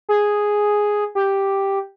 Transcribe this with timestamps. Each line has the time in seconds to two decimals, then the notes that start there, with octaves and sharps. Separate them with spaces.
0.09 G#4
1.15 G4